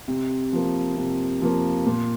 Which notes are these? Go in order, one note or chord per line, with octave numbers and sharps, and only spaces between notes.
C3
F3 A#3
C3
F3 A#3
A#2